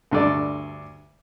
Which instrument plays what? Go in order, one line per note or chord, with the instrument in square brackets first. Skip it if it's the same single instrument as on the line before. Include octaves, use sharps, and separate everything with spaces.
[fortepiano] D2 G2 A4 D5